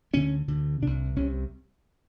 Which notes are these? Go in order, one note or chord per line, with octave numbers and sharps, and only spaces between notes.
D2 D3 C#4
D2 D3
C2 C3 D4
C2 C3 C#4